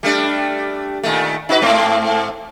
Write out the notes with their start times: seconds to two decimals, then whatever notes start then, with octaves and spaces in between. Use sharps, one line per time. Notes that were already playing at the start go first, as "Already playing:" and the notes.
0.03 G3 A3 D4
1.03 A#2 D#3 A3
1.49 D#4 F#4 B4
1.61 G#2 A3 C4